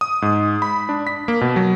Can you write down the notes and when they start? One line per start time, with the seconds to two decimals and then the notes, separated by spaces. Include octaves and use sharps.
0.01 D#6
0.22 G#2
0.62 B5
0.89 D4
1.07 B6
1.28 A#3
1.41 B2
1.56 F#3